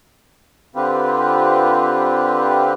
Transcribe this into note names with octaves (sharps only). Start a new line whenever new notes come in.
D3 C4 F4 G4 B4